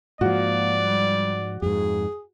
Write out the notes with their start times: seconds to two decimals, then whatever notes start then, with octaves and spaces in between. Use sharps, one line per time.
0.21 G#2 F3 A#3 F#4 D5
0.85 G3
1.62 F2 G#2 G#4